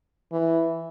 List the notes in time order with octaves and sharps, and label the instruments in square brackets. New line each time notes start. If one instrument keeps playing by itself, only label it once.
[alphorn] E3